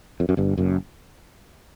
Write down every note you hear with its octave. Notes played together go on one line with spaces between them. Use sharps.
F2
F#2
G1 G2
F#1 F#2